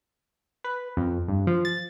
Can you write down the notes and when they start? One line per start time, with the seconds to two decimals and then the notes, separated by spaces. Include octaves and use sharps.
0.64 B4
0.97 F2
1.28 G2
1.47 F3
1.65 A6